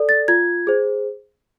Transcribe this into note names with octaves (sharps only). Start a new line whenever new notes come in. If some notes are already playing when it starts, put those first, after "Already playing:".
Already playing: A4 D5
A6
F4 G#6
G#4 C5